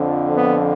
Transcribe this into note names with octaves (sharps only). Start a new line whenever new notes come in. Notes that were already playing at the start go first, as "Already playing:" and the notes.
Already playing: F2 D3 F3
B3